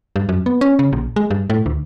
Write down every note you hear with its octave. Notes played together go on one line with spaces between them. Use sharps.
G2
F#2
B3
C#4
C#3
A#1
G#3
G2
A2
D2